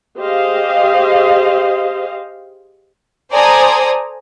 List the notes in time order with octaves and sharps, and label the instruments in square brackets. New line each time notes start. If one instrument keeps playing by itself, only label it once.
[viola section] G4 G#4 C5 D#5 F5
[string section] A4 C5 D5 G#5 A#5 D#6